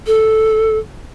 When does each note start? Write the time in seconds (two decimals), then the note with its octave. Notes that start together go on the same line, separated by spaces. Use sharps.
0.07 A4